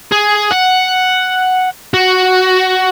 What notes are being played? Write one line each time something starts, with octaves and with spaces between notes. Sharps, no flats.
G#4
F#5
F#4